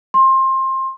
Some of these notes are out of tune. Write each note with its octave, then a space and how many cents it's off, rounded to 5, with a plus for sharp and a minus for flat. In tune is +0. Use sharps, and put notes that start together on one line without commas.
C6 +20